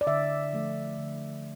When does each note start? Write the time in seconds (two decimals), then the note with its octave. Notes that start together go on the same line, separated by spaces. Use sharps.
0.01 D5
0.07 D3 E5
0.53 F3 A3
0.98 D3